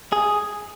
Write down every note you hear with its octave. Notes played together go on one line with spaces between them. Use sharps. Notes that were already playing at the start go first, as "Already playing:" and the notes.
G#4